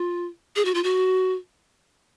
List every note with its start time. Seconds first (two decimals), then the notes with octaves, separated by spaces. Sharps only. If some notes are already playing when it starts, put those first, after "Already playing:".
Already playing: F4
0.56 G#4
0.65 F#4
0.74 F4
0.84 F#4